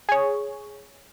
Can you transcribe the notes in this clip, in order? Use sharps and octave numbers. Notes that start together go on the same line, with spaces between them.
G#4 C#5